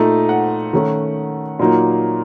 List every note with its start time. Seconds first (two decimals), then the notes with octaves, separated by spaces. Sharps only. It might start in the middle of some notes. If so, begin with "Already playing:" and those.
Already playing: A#2 A3 D#4
0.29 F#5
0.73 D#3 A3 C#4
1.59 A#2 F#3 A#3 D#4